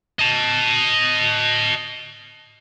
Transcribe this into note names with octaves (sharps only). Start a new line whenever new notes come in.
D#5 A5